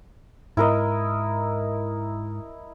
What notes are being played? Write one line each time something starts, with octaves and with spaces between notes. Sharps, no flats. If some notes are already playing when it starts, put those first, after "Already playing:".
G#2 E4 A#4 D#5